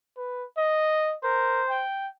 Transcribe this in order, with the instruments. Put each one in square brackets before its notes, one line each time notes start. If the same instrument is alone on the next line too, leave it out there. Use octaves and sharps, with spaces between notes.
[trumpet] B4
D#5
[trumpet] A#4 [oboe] C5
[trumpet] G5